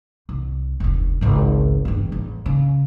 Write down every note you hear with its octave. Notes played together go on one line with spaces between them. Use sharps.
C2
F1 D2
G#1 C#2
E2 G2
A1
C#3